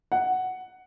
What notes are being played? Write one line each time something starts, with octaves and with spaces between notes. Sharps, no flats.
F#5